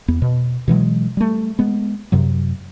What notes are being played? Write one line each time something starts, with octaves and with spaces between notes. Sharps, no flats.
E2 B3
B2
B2 E3 F#3 G#3
G3 A3
G#3 B3
F#2 C3 F#3